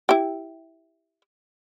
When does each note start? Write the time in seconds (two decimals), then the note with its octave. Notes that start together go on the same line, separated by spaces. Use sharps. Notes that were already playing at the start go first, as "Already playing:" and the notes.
0.09 E4 G4